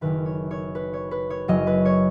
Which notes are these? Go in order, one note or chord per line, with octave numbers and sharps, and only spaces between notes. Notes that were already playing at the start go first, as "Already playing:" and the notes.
F#1 F#2 D#3 B4
C#5
C#5
B4
C#5
B4
C#5
F#1 F#2 F#3 D#5
B4
C#5